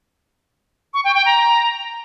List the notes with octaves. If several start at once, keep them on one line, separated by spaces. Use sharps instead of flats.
C#6
G5
G5
A#5